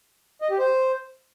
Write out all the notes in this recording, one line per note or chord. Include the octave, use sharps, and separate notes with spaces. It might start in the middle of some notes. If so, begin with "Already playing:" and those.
D#5
G4
C5